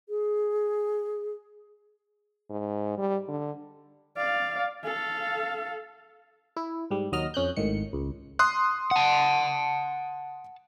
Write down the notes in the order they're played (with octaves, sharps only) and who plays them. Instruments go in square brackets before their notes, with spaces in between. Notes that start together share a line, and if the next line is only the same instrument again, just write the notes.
[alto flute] G#4
[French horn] G#2
G3
D3
[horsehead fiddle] D5 F5
A4 F5
[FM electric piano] E4
G#2 G3
D#2 F#3 D#5 A#5 F6
F2 C#4 F#6 G6
G#1 A2 D#3 C#7
C#2
[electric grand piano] C6 D#6 F#6
[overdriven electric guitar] F#5 A5